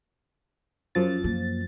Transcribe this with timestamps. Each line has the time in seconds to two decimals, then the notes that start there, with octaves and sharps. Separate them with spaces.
0.95 F#2 F3 A6
1.24 A#3